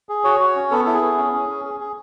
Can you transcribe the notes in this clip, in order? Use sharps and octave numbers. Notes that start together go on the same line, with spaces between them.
G#4
F#4 C#5
F#4
C#4
B3 A4
E4 A4
G#4
B3
C#4
C#4
C#4
G#4
G#4